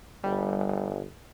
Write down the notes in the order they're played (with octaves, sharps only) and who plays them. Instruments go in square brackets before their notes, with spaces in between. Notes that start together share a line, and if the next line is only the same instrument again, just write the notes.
[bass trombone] G1 [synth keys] G3